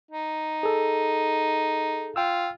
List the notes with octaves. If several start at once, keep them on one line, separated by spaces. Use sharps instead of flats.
D#4
G#4 A4
F4 G5 E6